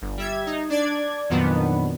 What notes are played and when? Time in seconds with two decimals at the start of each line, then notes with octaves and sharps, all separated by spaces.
0.02 G1
0.17 G3 E5 G#6
0.47 D#4
0.70 D4 D5 G#6
1.30 F2 A#2 D#3 F#3 B3 D4